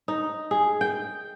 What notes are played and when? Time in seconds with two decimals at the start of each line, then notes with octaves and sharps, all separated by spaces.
0.08 D#4
0.51 G#4
0.81 G5